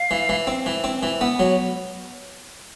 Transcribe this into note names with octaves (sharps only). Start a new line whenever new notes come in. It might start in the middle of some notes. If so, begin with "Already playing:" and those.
Already playing: F5
E3
E3
C4
E3
C4
E3
B3
F#3